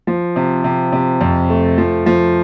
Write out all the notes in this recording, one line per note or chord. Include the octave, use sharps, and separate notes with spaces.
F3
C3
C3
C3
F2
A3
F3
F3